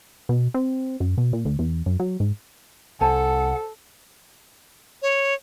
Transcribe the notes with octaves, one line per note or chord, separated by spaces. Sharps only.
B2
C4
F#2
B2
A#2
D2
E2
F#2
F#3
G#2
C2 A4 C5 F#5 G#5 A5
C#5